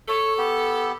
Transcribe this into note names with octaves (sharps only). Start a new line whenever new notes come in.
A4 C#5
B3 G4